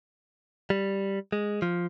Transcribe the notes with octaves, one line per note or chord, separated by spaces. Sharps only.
G3
G#3
F3